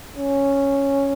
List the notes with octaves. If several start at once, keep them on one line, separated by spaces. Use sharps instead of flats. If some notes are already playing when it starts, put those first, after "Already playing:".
C#4